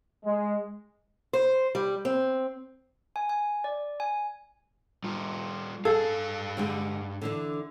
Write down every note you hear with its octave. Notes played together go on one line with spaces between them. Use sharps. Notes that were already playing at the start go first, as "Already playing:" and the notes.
G#3
C5
G3
C4
G#5
G#5
D5
G#5
G3 F4
G2 G#4 A4 F5
D3 G3 G#3
D3 E3 D4